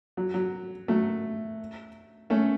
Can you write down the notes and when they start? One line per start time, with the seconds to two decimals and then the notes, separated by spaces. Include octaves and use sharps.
0.17 F#3
0.34 F#3
0.88 F#3 A3
2.30 A3 C#4